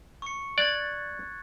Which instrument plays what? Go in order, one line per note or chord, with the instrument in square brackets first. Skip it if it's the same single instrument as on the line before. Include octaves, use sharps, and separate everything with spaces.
[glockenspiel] C#6 C#7
[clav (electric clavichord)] D5 [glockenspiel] F#6 G#6 A6